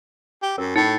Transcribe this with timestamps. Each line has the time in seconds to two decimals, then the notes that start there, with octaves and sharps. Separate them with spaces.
0.42 G4
0.58 F#2 A#4
0.76 A2 D#4 A6 C#7